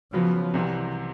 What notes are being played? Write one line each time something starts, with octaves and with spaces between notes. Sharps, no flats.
C#3 F3 F#3 B3
C2 C3 E3